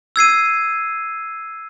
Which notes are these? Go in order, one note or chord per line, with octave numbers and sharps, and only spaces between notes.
E6 G#6 C7 D#7